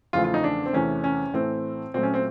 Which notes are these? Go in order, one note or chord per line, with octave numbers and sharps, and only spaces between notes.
E2 C#3 F3 A3 F4
F4
D#4
D4
C4
E2 C3 E3 A3 C#4
C#4
A2 E3 A3 C4
A#2 F#3 A3 C4
C#4
C4